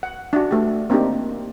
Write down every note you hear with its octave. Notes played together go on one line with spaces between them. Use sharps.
F#5
D4 F#4
A3 G4
A#3 C4 D4 D#4 G4